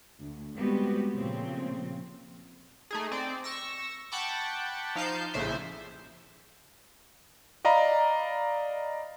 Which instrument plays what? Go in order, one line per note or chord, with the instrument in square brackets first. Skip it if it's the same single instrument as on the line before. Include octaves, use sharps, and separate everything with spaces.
[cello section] D2
G3 G#3 B3 C4 F#4 G4
A#2 C#3 F3 A3 C4
[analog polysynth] A3 D#4 G#4
C4 D5
C#6 E6 A#6
F#5 G5 A5 B5 C#6 D6
F3 D#4 F5 A5 G6 C7
A#1 A2 C#3 C5 E5
[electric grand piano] D5 D#5 F5 A#5 B5